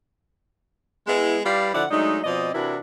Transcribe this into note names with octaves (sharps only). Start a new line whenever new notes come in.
G#3 B3 E4
G3 E4 G4 B4 D5 F5
D3 F3 E4 D5 F#5
F#3 G#3 A3 D4 D#4
B2 F3 C4 D5 D#5
C3 E3 D4 E4 F#4 A#4